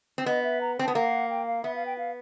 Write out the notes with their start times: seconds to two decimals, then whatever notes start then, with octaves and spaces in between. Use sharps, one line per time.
0.18 C4
0.26 B3 D#5
0.44 E5
0.61 A#5
0.79 C4
0.84 B3 A5
0.95 A#3 F#5
1.30 G5
1.47 F5
1.64 B3 E5
1.76 F5
1.86 G5
1.98 F5